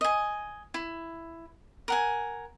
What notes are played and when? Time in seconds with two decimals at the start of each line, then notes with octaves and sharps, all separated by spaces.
0.01 D#5 G#5
0.74 E4
1.88 A#4 F#5 G#5